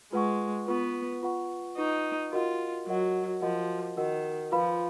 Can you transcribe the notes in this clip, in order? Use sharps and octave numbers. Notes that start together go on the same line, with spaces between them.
G#3 F4 B4 F#5 C#6
B3 F4 B4 F#5 C#6
F4 B4 F#5 C#6
D#4 F4 B4 F#5 C#6
F4 F#4 A#4 D#5 F#5
F#3 F#4 A#4 D#5 F#5
F3 F#4 A#4 D#5 F#5
D#3 F#4 A#4 D#5 F#5
F3 F4 B4 F5 B5